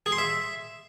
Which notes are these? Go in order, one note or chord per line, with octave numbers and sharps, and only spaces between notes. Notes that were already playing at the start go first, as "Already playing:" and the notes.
G#4
C6
E5